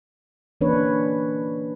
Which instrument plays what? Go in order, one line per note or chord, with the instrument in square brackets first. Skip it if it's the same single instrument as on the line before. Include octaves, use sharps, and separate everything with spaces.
[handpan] E3 A#3 C#4 D4 B4 C#5